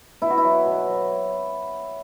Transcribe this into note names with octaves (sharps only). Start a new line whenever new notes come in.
B2 E4
F#4
E4
F#3
B2
F#3